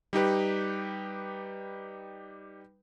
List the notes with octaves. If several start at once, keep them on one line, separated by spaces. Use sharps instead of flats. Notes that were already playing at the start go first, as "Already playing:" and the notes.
G3 D#4 G4 B4